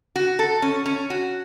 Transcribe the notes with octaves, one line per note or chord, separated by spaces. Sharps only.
F#4
A4
C#4
C#4
F#4